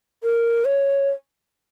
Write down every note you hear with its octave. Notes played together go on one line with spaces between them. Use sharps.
A#4
C#5